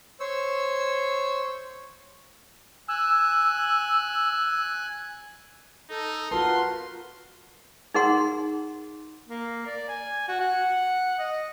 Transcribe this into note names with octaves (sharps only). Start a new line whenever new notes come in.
C5 C#5 E6
G#5 E6 F#6
D#4 A4
F4 F#4 A#4 B4 A5 C6
D#4 G#4 A#4 F#5 C6
A#3
D5
G#5
F#4
F#5
D#5